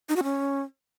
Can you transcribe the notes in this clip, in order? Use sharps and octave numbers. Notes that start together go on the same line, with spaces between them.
D#4
F#4
C#4